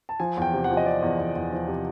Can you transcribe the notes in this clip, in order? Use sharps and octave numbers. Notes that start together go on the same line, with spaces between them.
A5
F3 G#5
E2 G5
C3
F#5
F3
D#5
C3 D5
E2
E2
E2
F3
C3